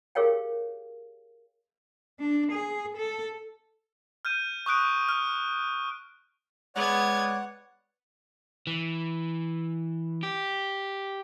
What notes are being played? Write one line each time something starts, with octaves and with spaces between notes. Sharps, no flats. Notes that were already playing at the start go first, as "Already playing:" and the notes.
G4 G#4 A#4 C#5 F5 G5
D4
G#4
A4
F6 G6 D#7
C#6 D#6 F#6 D7
F6
G#3 B3 C#5 D5 F#5 G#6
E3
G4